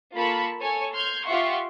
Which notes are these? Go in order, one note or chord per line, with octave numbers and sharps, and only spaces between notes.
A#3 F4 A4 A5 B5 C#6
A4 C#5 G#5
C6 F6 G6 G#6
F4 G4 E5 F#5 C6 C#6